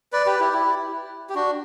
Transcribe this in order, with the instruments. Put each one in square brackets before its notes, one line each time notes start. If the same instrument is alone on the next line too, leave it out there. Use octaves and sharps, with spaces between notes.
[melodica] B4 D5
G4 B4
E4 G4
E4
G4
D4 F#4